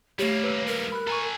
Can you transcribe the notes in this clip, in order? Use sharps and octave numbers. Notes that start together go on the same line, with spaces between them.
G3 A3 A#3 G4 C#5
B4 E6
A#4
B5 F#6
A4 G#5 A#5 C#6